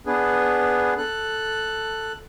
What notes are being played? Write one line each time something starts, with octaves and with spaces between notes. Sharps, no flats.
B3 D4 G#4 B4
A4 F#6